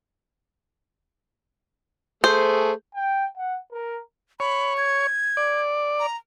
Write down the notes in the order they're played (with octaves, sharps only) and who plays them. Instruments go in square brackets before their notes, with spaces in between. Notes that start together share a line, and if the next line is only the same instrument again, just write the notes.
[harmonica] A3 G#4 [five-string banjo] C5
[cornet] G5
F#5
A#4
[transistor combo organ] C#5 [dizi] B5
[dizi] G#6
[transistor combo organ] D5
[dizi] A#5